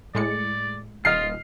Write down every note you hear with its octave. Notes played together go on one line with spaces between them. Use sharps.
A2 G#3 D5 C#7
D#1 F4 D#5 F6 C7